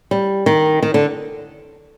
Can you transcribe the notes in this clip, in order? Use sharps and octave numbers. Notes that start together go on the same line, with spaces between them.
G3
D#3
D#3
D3